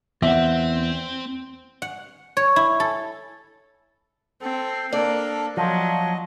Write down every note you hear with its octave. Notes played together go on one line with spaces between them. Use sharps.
E2 C4 E5 F#5
F#5
C#5
E4
A4
C4 A4
A#3 D4 A4 D5
F3 F#3 D#5